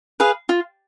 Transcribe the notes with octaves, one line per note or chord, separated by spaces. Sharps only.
G#4 B4 F5
F4